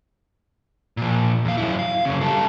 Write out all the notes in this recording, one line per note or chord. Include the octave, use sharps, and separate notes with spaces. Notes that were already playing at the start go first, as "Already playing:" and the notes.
A#2 F3
E2 F5
F#2 E4
F5
F#2 C#3
G3 A4